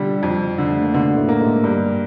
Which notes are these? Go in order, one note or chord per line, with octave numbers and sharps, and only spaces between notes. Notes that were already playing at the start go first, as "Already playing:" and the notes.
Already playing: B2 D3 G3 B3 F4
F2
D3
A3
A#3
B2 D3 B3
A2 A3
A#3
G#2 G#3
G2 G3